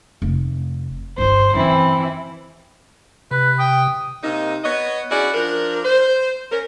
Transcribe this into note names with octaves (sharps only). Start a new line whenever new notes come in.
F1
G1 F4 C5
F#2 E3 C4 E4
C3 B4
G5 D#6
C3 A#3 D#4
B3 C#5 D#5
C#4 E4 F#4 G#4 D5
F3 D4 A#4
C5
C#4 A#4